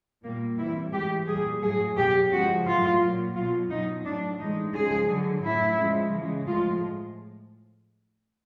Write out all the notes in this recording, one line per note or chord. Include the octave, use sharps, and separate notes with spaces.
A#2 G3 A#3
C3 E3 G3 E4
A2 E3 G#3 G4
A#2 G3 G#4
A2 F#3 G#4
B2 F#3 G4
C#3 F3 G#3 F#4
A2 F#3 F4
A#2 F#3
B2 F#3 F4
B2 F#3 D#4
A2 F#3 D4
A2 E3 G#3 D#4
C#3 F3 G#3 G#4
D3 F#3
A2 F#3 E4
C#3 F3 G#3
C#3 E3 G#3
A2 F3 G#3 F4